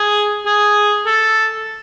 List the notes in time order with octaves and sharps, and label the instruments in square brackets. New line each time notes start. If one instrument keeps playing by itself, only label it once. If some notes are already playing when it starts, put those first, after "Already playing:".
Already playing: [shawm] G#4
G#4
A4